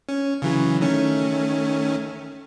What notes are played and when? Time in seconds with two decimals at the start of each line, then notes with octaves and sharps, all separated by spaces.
0.09 C#4
0.42 C#3 E3 F#3
0.81 D#3 A3 C#4